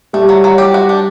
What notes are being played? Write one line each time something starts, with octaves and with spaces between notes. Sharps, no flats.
G3 A3
F#3
F#3
G4
F#4
D4